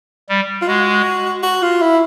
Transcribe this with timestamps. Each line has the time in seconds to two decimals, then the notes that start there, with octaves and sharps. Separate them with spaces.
0.29 G3
0.62 F4
0.68 G#3 F#4
1.43 F#4
1.62 F4
1.82 E4